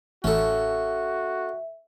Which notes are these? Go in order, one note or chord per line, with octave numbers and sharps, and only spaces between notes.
A1 C#4 F#4 A4 E5